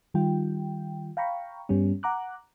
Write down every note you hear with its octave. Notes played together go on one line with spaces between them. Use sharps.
D#3 G3 F4 G5
F5 G5 A#5 B5 C#6
G2 G3 B3 C#4
F#5 A#5 D6 F#6